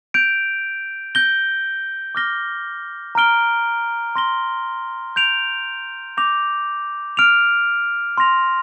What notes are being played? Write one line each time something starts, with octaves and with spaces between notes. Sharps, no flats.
G6 D7 F7
G6 A#6 G7
D6 F6 A#6 G7
A#5 F6 D7 G7
C6 A#6 G7
G6 D7 F7
D6 G6 A#6 F7
F6 D7 F7
C6 A#6 F7